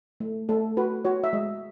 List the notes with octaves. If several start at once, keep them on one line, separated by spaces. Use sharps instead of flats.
A3
A3 A4
F#4 B4
F#4 C#5
E5
G#3 D#5